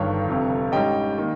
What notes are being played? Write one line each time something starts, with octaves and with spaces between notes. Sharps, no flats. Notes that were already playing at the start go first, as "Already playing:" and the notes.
Already playing: G1 G2 D#3 C#5 F5
G1 F2 C3
G#2 G3 C#4 D#5 G5
D#3 A#3